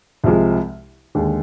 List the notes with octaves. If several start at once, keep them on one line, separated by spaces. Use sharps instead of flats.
C2 C3 F3 G#3
D#2 D3 G#3